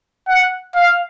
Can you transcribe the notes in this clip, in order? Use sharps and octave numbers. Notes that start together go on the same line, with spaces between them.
F#5
F5